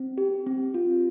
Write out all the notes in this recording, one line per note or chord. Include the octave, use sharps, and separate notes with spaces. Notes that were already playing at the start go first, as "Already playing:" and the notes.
Already playing: C4
G4
C4
F4